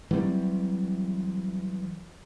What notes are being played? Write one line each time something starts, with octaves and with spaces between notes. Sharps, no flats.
E3 F#3 G3 C4